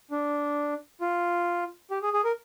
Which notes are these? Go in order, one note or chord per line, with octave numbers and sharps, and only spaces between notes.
D4
F4
G4
G#4
G#4
A#4